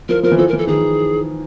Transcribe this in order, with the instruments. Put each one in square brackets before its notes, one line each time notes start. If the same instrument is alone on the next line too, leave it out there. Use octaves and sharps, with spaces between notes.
[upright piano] F3 [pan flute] A#4
[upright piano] F3 [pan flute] A#4
[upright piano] E3
[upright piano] F3 [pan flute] A4
[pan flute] A#4
[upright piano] E3
[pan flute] A4
[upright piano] D#3 [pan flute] G#4